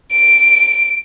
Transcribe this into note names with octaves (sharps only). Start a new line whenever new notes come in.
D7